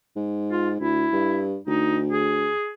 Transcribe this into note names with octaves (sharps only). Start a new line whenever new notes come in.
G#2
F4
D2 E4
G2
D2 D#4
G#4